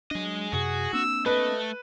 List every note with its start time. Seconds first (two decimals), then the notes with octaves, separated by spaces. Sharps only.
0.11 F#3 G#3 D4 D#5
0.53 F#2 C3 F#4 G#4
0.93 A#3 C4 D4 E6
1.26 A3 A4 B4 D#5